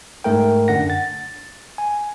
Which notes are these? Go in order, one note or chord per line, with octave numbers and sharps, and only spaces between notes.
G#2 A3 A#4 G5
F#2 D3 D4 F#5 A#6
A6
G#5